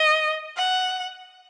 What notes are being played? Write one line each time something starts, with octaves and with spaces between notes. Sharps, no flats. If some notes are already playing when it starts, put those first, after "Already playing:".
Already playing: D#5
F#5